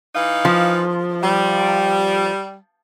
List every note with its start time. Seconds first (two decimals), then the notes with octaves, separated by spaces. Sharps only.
0.15 E3 D#4 F5
0.45 F3
1.22 G3